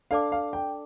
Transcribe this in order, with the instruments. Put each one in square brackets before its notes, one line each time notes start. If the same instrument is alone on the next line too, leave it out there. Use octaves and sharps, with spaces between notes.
[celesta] D4 A4 D5 A5 D6 [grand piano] F5
[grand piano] F5
G5